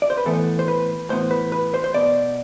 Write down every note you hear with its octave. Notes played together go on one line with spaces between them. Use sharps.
D5
C5
B4
A2 E3 B3 A4
C5
B4
A2 E3 B3 C5
B4
B4
C5
C5
B2 B3 D5